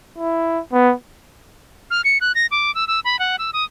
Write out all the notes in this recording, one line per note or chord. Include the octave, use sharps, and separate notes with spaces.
E4
B3
F6
C#7
F#6
A#6
D6
E6
E6
B5
F#5
E6
D#6